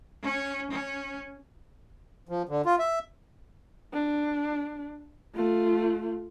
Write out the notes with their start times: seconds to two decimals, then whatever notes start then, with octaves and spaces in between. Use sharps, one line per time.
0.23 C#4
0.70 C#4
2.29 F3
2.49 D3
2.66 F4
2.79 E5
3.94 D4
5.35 A3 F4